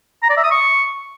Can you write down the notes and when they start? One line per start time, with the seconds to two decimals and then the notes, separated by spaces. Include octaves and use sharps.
0.23 A#5
0.30 D5
0.37 E5
0.44 D#6
0.51 C#6